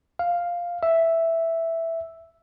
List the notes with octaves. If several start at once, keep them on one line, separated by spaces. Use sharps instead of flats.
F5
E5